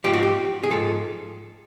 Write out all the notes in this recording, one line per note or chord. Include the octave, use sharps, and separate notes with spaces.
G#2 F3 G4
F#4
G4
G#4
G#2 F3 A4